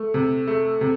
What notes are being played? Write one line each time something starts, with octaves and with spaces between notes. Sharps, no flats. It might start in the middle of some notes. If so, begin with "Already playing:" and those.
Already playing: A3
C3
A3
C3